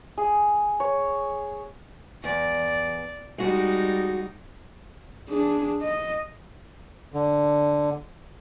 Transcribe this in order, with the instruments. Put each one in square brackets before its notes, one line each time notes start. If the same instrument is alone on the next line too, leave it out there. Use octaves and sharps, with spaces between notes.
[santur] G#4
C#5
[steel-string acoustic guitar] E2 [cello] D5
[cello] G3 D#4 [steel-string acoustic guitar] G#3 F#4
[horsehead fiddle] D4 G#4
D#5
[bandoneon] D3